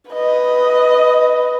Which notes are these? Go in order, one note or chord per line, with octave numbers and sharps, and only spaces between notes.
B4 D#5